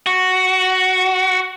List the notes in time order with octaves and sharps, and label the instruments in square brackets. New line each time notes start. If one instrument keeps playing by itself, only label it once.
[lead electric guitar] F#4